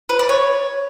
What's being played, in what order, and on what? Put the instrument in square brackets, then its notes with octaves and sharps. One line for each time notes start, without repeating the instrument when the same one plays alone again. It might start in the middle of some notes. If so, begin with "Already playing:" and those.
[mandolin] B4
D5
C#5